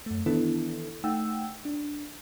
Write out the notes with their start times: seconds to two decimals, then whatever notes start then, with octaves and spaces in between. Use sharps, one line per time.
0.06 F#2 A3
0.26 D#3 E3 B3 D4 E4 A4
1.04 A3 D#4 F#5 G5 E6
1.65 D4